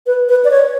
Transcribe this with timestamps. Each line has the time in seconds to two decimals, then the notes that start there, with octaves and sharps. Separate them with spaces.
0.07 B4
0.29 B4
0.45 D5
0.51 C#5